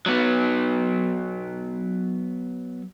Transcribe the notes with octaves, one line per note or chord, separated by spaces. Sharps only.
F#3 B3